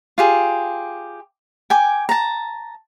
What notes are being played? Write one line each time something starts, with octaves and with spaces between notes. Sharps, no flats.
F4 G4 G#4
G5 G#5 D6
A5 A#5